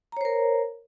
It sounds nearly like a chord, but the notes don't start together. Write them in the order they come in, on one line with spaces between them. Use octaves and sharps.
A#5 C#5 C5 A#4